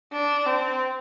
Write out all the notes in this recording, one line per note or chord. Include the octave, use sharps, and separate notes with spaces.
D4
C4